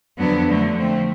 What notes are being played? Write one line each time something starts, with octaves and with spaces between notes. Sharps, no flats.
F2 D3 F#3 B3 D4
D3 F#3 A3
F3 A3 C4